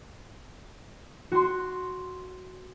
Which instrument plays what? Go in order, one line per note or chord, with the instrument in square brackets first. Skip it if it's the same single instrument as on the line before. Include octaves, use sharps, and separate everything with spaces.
[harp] F#4 C6